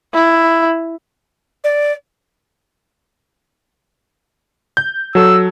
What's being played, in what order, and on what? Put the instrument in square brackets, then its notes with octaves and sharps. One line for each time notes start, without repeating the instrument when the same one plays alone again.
[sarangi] E4
[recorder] D5
[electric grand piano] G6
[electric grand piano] F#3 A4 [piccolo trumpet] E6